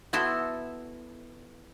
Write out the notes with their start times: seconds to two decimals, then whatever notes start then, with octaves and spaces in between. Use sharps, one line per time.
0.13 B3 E4 F#4 A4 C6